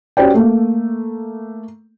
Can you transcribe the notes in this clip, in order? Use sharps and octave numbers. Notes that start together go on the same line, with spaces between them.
C#4 F#4 G4 C5 D5 G5
A3 A#3